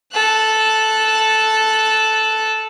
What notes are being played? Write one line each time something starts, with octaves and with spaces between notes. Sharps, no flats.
A4 F#6